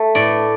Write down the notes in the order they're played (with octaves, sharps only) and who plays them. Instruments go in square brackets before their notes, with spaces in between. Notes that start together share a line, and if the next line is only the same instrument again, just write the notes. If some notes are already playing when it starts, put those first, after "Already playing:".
Already playing: [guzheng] A3
A2 D5